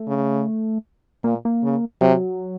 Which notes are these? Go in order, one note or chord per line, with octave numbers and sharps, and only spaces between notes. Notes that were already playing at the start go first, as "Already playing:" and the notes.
Already playing: A3
C#3
A#2 A#3
A#3
C#3
C3 F#3